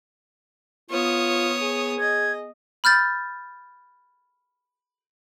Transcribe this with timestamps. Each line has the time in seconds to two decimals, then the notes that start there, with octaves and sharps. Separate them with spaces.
0.90 B3 F4 C#5 D#6
1.62 G#4
1.99 D#5 G#6
2.84 B5 F6 G6 A6